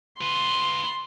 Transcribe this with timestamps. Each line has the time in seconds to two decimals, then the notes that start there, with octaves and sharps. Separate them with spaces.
0.21 F4 B4 C6